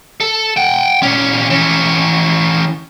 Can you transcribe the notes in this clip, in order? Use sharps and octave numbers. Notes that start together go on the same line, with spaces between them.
A4
F#5 G5
A#2 C#4
E3 C#4